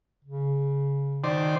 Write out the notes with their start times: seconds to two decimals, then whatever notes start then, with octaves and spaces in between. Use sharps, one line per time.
0.24 C#3
1.24 D#3 C5 D5